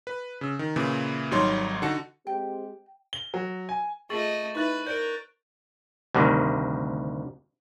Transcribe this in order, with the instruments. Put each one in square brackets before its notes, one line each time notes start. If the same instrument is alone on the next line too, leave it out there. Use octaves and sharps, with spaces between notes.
[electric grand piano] B4
C#3 E6
D#3
A#2 C#3 E3
G#1 F#3 G3 D#4 C#5 C6
D3 D#4 F#4 F#5 A5 C#7
[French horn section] G#3 C4 G4 [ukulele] G5
[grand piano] G7
F#3
G#5
[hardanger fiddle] A3 D#5 [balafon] F4 G#4 [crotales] C#6 A6 F#7
[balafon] D#4 E4 E5 [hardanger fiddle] B4 [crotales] C#6 F#6 A6
[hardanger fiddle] A#4 [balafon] C5 D5 [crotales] G6 D7
[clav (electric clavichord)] D2 G2 C3 D#3